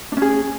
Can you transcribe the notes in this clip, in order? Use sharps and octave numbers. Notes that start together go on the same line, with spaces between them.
C#4 D4 G#4